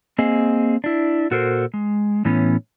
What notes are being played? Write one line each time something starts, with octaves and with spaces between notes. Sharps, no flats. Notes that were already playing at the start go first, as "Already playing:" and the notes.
A#3 C4 G#4 D#5
D4 E4
A#2 F#4 A4 A#4 C5
G#3
A2 E3 B3 C#4